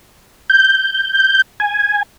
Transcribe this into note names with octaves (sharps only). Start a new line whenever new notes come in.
G6
G#5